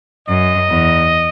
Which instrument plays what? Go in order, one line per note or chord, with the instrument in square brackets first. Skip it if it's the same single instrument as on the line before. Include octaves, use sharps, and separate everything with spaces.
[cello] F#2 [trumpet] D#5
[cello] E2